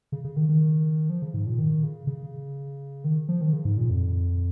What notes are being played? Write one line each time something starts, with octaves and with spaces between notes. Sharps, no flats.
C#3
C#3
D#3
D#3
F3
C#3
G#2
A#2
D#3
C#3
C#3
D#3
F3
D#3
C#3
G#2
A#2
F2